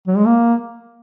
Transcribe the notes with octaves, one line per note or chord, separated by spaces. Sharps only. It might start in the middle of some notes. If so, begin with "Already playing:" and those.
F#3
G#3
A#3